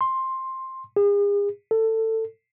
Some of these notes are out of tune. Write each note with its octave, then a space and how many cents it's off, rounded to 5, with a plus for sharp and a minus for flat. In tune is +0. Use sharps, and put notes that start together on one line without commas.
C6 +10
G#4 -40
A4 +20